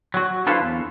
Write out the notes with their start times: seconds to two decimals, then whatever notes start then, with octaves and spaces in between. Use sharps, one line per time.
0.14 F#3 F#4
0.47 D4 E4 F4 A4 B4 C5
0.60 E2